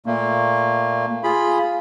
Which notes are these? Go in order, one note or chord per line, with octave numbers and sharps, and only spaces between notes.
A#2 A3 A#3
F4 G#4 B5